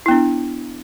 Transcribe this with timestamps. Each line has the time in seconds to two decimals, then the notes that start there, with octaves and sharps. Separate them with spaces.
0.06 E4
0.08 B3
0.11 D4